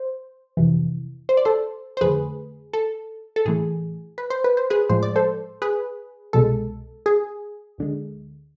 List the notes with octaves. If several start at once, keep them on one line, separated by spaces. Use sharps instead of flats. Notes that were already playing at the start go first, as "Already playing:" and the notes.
Already playing: C5
F2 C3 E3
C5
D5
A4 C5
C5
F2 D3 A3 G#4 B4
A4
A4
A2 E3 A3 G#4
B4
C5
B4
C5
G#4 B4
A2 F3 G#3 C5
D5
A4 C5
G#4 B4
C2 B2 G#3 A4
G#4
D2 D3 G#3